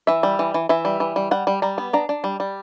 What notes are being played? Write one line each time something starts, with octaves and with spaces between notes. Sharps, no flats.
E3 E5
G3
E3
E3
E3 E5
G3
E3
G3
G3 F#5
G3
G3 A#5
B3
D4 A#5
D4
G3
G3